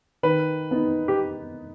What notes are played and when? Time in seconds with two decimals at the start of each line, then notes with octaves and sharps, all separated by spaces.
0.23 D#3 B4
0.71 B3 D#4
1.08 G4